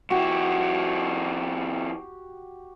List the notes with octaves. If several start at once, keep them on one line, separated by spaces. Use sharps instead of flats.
F2 E4 F#4 G4